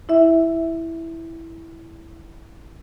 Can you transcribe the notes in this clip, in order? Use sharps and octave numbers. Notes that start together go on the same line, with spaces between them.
E4 E5